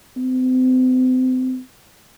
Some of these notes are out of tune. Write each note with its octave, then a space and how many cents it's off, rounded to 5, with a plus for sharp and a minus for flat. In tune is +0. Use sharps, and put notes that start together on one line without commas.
C4 -35